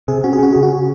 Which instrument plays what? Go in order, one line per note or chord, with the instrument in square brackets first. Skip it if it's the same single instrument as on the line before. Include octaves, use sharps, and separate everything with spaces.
[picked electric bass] C3 [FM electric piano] G#4
[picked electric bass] C#4 [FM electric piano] F#4
[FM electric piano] G#4
[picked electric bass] C#4 [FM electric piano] F#4
[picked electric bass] C#3 [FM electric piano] G#4
[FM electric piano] F#4